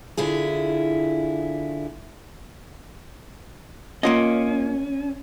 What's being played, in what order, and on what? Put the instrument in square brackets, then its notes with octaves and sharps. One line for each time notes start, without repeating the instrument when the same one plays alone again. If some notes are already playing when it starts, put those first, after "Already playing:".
[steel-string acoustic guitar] D3 E4 F4 G#4
[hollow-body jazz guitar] A#3 F4 D#5 [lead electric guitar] C#4